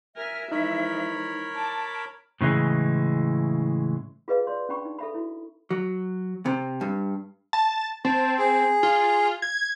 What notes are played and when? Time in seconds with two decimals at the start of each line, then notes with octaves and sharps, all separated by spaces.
0.15 A#4 E5 G#5 F6
0.52 E3 F3 G#3 D#4 A#4 C#5 B5
1.55 A5 D6
2.41 A2 C#3 E3 G#3
4.28 F4 G#4 B4 D#5 F5
4.47 G#4 C#5 D5 C6
4.69 C#4 D4 G5 B5 C#6
4.85 D#4
4.98 A4 E5 B5
5.14 E4 F#4
5.71 F#3
6.46 C3
6.81 G2
7.53 A5
8.05 C4 A5
8.39 G#4
8.83 F4
9.42 G#6